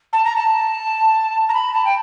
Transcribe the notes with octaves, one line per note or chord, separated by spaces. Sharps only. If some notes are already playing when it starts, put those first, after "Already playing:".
A5
A#5
A5
A#5
B5
A5
G5